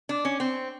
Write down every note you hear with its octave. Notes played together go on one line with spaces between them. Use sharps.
D4
C#4
C4